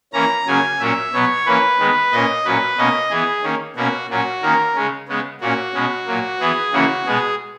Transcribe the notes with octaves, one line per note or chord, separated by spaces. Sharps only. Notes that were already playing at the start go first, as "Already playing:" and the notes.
E3 A#3 C#4 A#5
C#3 F#3 A#3 C#4 G#5
A#2 F#3 A#3 C#4 E5
B2 F#3 B3 C#5
E3 A#3 C#4 B4
D#3 G#3 B3
A#2 A#3 C#4 D#5
A#2 F#3 C#4 B4
B2 A#3 C#4 D#5
E3 B3 G#4
D#3 A#3 C#4
B2 A#3 C#4 F#4
A#2 F#3 C#4 F#4
D#3 A#3 C#4 A#4
C#3 G#3 C#4
C#3 G#3 B3
A#2 A#3 C#4 F#4
B2 G#3 C#4
A#2 F#3 A#3
E3 B3 G#4
C#3 E3 A#3 C#4 F#4
B2 G#3 B3 G#4